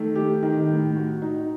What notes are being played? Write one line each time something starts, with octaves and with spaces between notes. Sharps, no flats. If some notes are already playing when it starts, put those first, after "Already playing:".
Already playing: D#3 A3
G4
D#3
A2
F#4
D#4